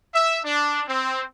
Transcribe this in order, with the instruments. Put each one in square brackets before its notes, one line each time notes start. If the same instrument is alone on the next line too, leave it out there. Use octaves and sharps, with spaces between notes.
[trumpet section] E5
D4
C4